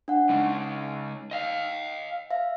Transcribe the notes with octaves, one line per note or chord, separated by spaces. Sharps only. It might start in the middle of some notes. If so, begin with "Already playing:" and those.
D4 F#5
C#3 G#3 C#4 D#4
D#5 F5
E5 F5